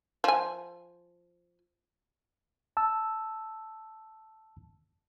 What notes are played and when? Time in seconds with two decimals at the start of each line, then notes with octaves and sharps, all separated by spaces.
0.24 F3 G#5
2.77 A5 E6